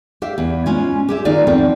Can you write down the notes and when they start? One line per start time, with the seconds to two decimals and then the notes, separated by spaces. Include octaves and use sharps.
0.22 G4 E5 F5
0.38 E2
0.66 G#3 C#4 F4
1.09 G4 G#4 E5
1.25 D#3 A#3 D#4 F4 D5
1.47 E2 F3 C4 A4 D5 G5